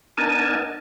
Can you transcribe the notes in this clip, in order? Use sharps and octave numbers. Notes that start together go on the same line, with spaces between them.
B3 D4 D#4 A#4 G#5 A5